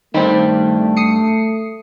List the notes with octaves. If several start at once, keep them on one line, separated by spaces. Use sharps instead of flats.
G2 D#3 A3 C4 G5 B5
D#6 C7 C#7